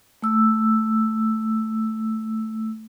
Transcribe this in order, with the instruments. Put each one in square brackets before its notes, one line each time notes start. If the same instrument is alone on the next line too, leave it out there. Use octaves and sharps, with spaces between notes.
[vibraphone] A3 E6